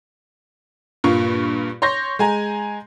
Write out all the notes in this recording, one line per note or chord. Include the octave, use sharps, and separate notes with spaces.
G2 A#2 F4 C#6
C#5 C6 C#6 G6 A#6
G#3 G#5 A#5